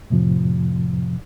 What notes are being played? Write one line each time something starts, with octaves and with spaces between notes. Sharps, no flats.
F2 A2 C3 F3